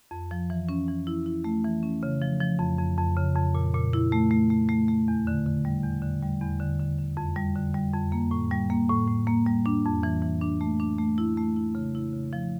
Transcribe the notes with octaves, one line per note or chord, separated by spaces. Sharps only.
F2
F3
E3
C#4
E3
E4
E4
A3
E3
C#4
C#3
F3
F3
F2
F2
F2
C#3
F2
A#2
A#2
E4
A3
A3
A3
A3
A3
E2
D3
D3
G3
E2
D3
G3
E2
D3
D3
D3
F2
G3
D3
G3
F2
A#3
A2
G3
A#3
A2
A2
A#3
G3
D4
F2
E3
E3
D4
A3
D4
A3
E4
A3
E4
C#3
E4
C#3
F3